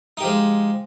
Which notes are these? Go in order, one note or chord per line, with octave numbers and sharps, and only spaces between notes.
F3 G#3 D#4 G4